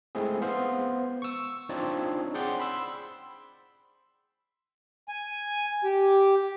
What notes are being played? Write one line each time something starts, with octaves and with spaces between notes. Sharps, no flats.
G#3 A3 C4 E4 G#4
B3 C5 F5
C#6 E6
C4 D4 D#4 F4 C#5 D5
G#4 C5 D5 F#5 G5 C6
B5 C6 E6
G#5
G4